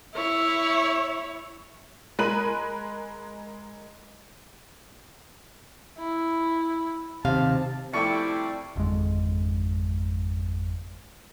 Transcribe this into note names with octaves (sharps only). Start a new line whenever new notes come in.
E4 C#5
G#3 A#4 B5 F#6 D#7 F#7
E4
D#2 C3 F5 A5
C3 F3 G3 A3 E4 D5 G5 C#6
G#1 F2 D3 G#3